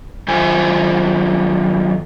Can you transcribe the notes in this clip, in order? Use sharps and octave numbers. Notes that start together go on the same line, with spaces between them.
F#2 D#3 F4 C5 G#5